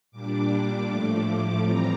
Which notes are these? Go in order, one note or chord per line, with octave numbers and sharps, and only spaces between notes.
A#2 G3 D4 D6
A2 F3 A3
E3 G3 C4 A#5